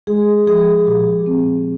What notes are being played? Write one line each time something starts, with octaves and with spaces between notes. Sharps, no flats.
G#3 G#4
F3 G#4
A#2 G4
C4